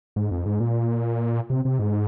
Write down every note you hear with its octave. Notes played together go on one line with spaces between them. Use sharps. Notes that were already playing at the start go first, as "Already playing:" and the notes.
G#2
F2
G#2
A#2
C3
C3
G#2